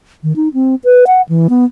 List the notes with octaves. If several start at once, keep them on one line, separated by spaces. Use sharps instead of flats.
D#3
D#4
C4
B4
F#5
E3
B3